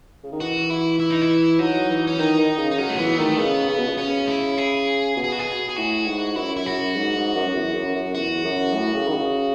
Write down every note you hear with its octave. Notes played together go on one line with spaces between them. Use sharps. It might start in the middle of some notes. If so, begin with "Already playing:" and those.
C#3
D#3
E3 F#4
E4
E4
D#4
E4
F#3 D#4
E3
C#4
D#3 D#4
D#3
C#3
D#4
F#3 C#4
A3
E3 B3
D#3 A3
C#3 B3
C#3
B2
C#3
C#4
E4
G#4
B2
G#4
F#4
G#4
G#4
A2 F#4
G#2
F#2 E4
E4
F#2 F#4
G#2
G#2
F#2
F#2
E2
F#2
F#2
E2 F#4
F#2
A2
C#3
D#3
C#3